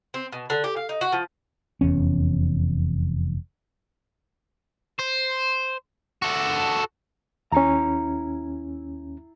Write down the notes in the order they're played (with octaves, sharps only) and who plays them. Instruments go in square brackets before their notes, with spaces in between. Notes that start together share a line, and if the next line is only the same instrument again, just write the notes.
[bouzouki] C4
B2
D3
G4
F5
D#4
F#4
F3
[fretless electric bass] F1 E2 C#4
[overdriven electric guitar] C5
F#4 A4
[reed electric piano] D#2 C#4 [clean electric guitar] E4 A#5